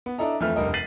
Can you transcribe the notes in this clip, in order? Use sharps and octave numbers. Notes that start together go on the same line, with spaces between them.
B3
D4 E4 A4 D#5 A#5
F2 E3 A3 E4 F6
F1 G2 A#4 D#5
A6 B6 C7 D#7 F#7